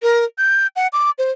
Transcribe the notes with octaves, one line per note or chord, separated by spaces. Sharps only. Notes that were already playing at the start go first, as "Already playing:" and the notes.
A#4
G6
F#5
D6
C5